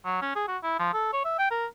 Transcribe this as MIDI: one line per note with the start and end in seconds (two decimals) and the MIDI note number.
0.05 0.21 54
0.22 0.31 61
0.36 0.44 68
0.48 0.58 66
0.63 0.77 64
0.79 0.90 53
0.94 1.12 69
1.13 1.21 73
1.25 1.38 76
1.39 1.48 79
1.51 1.66 70